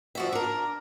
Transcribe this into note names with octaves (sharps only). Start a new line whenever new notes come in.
F3 F#4 E5
D4 A#4